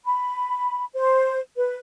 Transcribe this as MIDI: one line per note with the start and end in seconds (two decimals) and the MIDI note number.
0.05 0.84 83
0.94 1.39 72
1.57 1.77 71